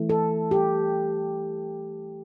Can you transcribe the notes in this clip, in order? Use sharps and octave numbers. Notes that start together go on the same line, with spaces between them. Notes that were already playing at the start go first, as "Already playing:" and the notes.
Already playing: E3 A3
A4
G4